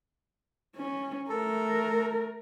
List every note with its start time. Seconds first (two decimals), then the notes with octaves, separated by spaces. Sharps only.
0.76 C#4
1.30 A3 A4 A#4